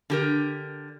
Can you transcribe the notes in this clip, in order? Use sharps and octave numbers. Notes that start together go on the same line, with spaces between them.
D3 G4 A#4